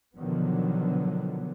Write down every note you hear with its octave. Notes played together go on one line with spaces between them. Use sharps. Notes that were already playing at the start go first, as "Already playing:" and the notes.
B2 D3 D#3 F3 F#3 B3